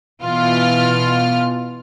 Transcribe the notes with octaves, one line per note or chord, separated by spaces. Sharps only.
B2 E3 F4 F6